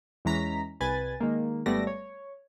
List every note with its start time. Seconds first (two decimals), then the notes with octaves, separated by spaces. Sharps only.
0.25 E2 E3 G#3 C#4 A#5 B6
0.80 C2 B4 G#5 A6
1.20 D#3 G#3 A#3
1.66 G#1 G3 A3 B3 D5 A#6
1.87 C#5